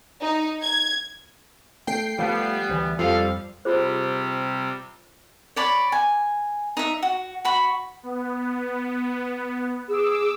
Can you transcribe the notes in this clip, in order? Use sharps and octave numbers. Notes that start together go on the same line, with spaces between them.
D#4
G#6
A3 G5 C7
F3 G3 A3 B3
D2 E3
F2 F3 G3 A4 F5
C3 G3 F4 G#4 C5
C#5 D5 B5
G#5
D#4 E5
F#4
F#4 B5 C#6
B3
G#4 D6 E6